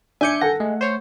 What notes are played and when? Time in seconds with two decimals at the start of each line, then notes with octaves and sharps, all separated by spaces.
0.21 D4 E5 G#5 D6 G6 C#7
0.41 A4 F#5 A#6
0.60 G#3 A3
0.81 C5 C#5